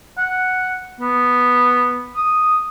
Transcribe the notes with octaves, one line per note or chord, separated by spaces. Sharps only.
F#5
B3
D#6